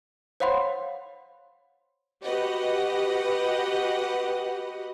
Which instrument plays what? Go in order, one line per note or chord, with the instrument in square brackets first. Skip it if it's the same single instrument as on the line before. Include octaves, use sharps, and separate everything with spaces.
[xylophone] C5 C#5 F5 F#5 B5 C6
[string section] F#4 G4 B4 D#5 F#5